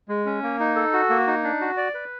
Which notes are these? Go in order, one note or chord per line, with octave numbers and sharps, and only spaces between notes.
G#3
C#4
A#3
D#4
A4
F#4
A#3
D#4
D4
F#4
D5
B4